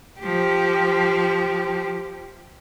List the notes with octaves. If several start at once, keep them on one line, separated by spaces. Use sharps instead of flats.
F3 G4